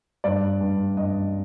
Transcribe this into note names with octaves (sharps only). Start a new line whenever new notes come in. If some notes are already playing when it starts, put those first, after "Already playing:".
G2 D5
G2
G2 D#5